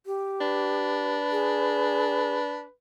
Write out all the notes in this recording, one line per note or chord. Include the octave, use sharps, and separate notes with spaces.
G4
D4 B4
G#4